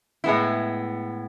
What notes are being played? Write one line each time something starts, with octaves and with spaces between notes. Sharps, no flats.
A2 G#3 B3 E4